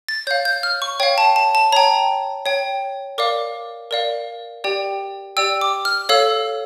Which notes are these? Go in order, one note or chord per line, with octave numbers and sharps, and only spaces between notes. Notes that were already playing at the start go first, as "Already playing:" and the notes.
A6
C#5 F5 G6
G6
F6
C#6
C#5 F5 G5
A5
A5
A5
C#5 G5 A#5
C#5 G5
A#4 D5 F5 D6
A#4 D5 F5
G4 D5 G5
G4 D5 G5 E6
D6
F6
A4 C#5 F5 E6